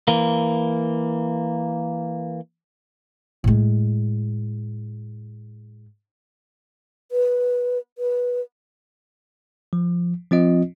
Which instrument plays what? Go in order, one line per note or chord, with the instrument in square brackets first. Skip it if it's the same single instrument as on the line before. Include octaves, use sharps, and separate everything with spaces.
[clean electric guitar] E3 A#3
[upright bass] A2 G#3
[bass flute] B4
B4
[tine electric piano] F3
F3 C4 F4 D#5